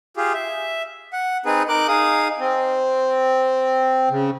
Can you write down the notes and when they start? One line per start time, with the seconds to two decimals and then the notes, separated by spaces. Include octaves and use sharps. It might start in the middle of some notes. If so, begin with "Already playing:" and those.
0.17 F4 G4 G#4
0.34 E5
1.13 F#5
1.46 C4 D#4 G#4 B4
1.69 D#4 A#4 D6 F#6
1.88 D#4 G#4 F5 D#6
2.39 C4
4.10 C#3